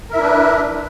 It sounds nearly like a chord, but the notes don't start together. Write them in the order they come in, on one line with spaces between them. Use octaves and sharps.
A#4 E5 E4 D4 B4